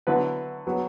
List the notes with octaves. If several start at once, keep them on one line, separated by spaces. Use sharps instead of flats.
D3 F#3 B3 E4 B4
F#3 B3